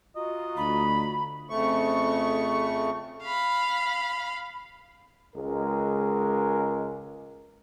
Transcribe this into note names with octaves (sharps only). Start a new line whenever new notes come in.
F4 F#4 D#5 A#5
D2 B5
F2 C#3 A3 C#6
F5 B5
C#2 G#3 A#4